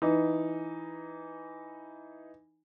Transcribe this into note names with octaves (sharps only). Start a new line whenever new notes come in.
E3 D#4